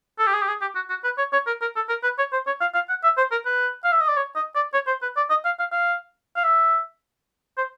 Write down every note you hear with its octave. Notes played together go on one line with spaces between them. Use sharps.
A4
G4
G#4
G4
G#4
G4
F#4
F#4
B4
C#5
C#5
A#4
A#4
A4
A#4
B4
C#5
C5
C#5
F5
F5
F#5
E5
C5
A#4
B4
F5
E5
D#5
D5
C#5
D#5
D5
C#5
C5
B4
D5
D#5
F5
F5
F5
F5
E5
C5